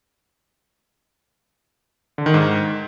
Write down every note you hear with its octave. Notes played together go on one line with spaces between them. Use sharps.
D3
D#3
G#2